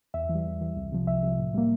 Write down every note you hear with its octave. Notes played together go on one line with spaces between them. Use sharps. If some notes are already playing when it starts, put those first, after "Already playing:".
E2 E5
E3
G3
E2
E3 G3
C2
C3 F3
C2 E5
C3 F3
A2
G3 A#3